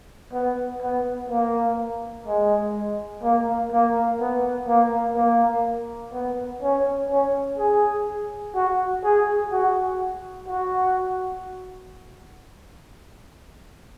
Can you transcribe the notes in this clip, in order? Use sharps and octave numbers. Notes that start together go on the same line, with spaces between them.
B3
B3
A#3
G#3
A#3
A#3
B3
A#3
A#3
B3
C#4
C#4
G#4
F#4
G#4
F#4
F#4